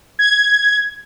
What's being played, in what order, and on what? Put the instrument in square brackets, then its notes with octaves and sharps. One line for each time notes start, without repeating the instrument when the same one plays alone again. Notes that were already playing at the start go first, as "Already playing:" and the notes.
[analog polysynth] G#6